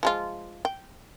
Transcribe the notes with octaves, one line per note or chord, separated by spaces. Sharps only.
F3 G#3 F4
G5